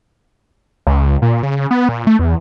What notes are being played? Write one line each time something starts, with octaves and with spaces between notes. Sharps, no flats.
C#2
A#2
C#3
B3
A#2
A3
E2